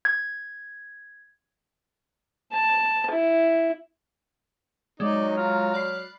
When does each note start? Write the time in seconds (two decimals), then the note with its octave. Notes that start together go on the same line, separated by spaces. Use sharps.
0.05 G#6
2.53 A5
3.11 E4
5.00 F#3 G#3 D#4 D5
5.37 F4 A#5 F6
5.74 D5 B5 F#6 C7